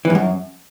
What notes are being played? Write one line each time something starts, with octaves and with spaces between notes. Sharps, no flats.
E3
G2
F#2